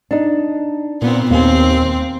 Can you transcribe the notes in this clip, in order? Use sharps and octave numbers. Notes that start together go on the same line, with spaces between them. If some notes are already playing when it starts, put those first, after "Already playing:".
D4 D#4
A#2 B3 C4
D#2 A#3 C4 G#5